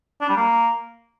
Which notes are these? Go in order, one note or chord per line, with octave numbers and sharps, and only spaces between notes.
D4
G3
A#3